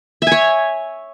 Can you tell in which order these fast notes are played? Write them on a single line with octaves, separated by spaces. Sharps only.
E5 G#5 C#5